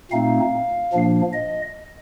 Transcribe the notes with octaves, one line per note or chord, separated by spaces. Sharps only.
A#2 A3 C4 D#4 F5
A#2 F3 A#3 D4
D#5